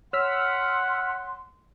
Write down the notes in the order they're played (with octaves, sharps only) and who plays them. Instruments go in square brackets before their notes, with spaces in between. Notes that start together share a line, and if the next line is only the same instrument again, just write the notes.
[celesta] C#5 [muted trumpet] F#5 [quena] C6 [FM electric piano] E6 F6 B6